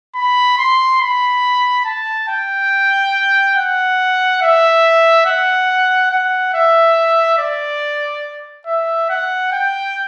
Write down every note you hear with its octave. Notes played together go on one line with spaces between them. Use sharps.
B5
C6
B5
A5
G5
F#5
E5
F#5
F#5
E5
D5
E5
F#5
G5